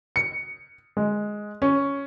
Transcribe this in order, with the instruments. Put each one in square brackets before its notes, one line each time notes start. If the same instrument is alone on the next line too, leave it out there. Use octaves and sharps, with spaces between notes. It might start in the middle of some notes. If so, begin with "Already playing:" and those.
[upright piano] C#7
G#3
C#4